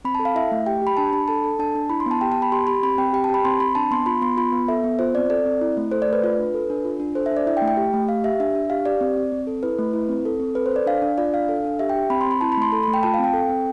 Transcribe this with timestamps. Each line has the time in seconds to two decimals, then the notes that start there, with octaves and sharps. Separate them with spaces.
0.05 C4 B5
0.15 A5
0.19 A4
0.25 F5
0.35 E4 E5
0.52 A3
0.66 G4 G5
0.82 G4 B5
0.97 D4 A5
1.13 D4 B5
1.28 A4 A5
1.44 A4
1.59 D4 A5
1.75 D4
1.89 E4 B5
2.00 C6
2.06 B3
2.11 A5
2.21 G4 G5
2.32 A5
2.36 B3
2.42 B5
2.52 G4 C6
2.67 G4 B5
2.83 C4 B5
2.98 C4 G5
3.13 G4 G5
3.24 A5
3.29 G4 B5
3.45 C4 C6
3.60 C4 B5
3.75 D4 A5
3.91 B3 C6
4.06 F4 B5
4.22 B3 C6
4.37 F4 B5
4.52 B3
4.68 A4 E5
4.84 B3
4.99 F4 C5
5.15 C4 D5
5.30 A4 D5
5.46 C4
5.61 E4
5.77 A3
5.91 A4 C5
6.02 D5
6.08 A3 B4
6.24 F4 B4
6.39 D4
6.54 A4
6.70 D4
6.85 F4
7.00 D4
7.15 A4 C5
7.26 E5
7.31 D4
7.37 D5
7.47 E4 E5
7.57 G5
7.62 A3
7.68 G5
7.77 G4
7.93 A3
8.08 G4 F5
8.24 G4 E5
8.40 D4 E5
8.55 D4
8.70 G4 F5
8.85 G4 D5
9.01 C4
9.16 C4
9.32 C4
9.47 A4
9.63 E4 B4
9.79 A3
9.93 E4
10.09 C4
10.25 A4
10.40 C4
10.55 A4 B4
10.66 C5
10.71 A4 D5
10.86 D4 F5
11.02 D4
11.18 F4 D5
11.34 D4 F5
11.48 A4 F5
11.64 D4
11.79 G4 E5
11.90 G5
11.95 G4
12.10 C4 B5
12.21 C6
12.26 C4 B5
12.41 E4 A5
12.52 B5
12.57 A3 C6
12.72 A4 B5
12.83 B5
12.87 A3
12.94 G5
13.03 F4 A5
13.14 F5
13.19 C4
13.24 G5
13.34 A4
13.49 C4